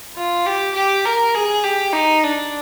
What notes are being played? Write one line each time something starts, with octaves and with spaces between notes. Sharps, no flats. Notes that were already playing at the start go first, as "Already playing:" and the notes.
F4
G4
G4
A#4
G#4
G4
D#4
D4